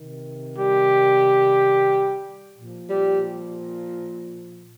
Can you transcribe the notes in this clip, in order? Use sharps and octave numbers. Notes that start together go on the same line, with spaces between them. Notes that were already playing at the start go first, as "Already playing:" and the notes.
Already playing: C3 D#3
G3 G4
A#2 F3
G3 G4